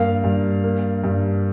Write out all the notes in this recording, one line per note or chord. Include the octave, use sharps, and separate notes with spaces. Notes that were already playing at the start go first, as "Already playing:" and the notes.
Already playing: G2 A#3 F5
G2
A#3
G2